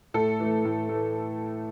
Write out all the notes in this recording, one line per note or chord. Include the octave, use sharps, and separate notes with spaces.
A2 A4
E3 A3
A2
E3 A3